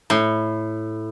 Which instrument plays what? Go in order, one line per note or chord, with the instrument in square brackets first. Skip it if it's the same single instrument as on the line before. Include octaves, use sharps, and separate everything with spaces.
[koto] A2